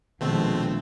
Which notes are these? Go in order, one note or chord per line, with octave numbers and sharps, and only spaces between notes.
A#1 B2 D#3 F3 G#3 A3 C4